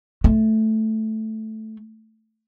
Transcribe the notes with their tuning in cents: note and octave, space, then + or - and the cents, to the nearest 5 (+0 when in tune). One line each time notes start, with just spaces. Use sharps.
A3 -5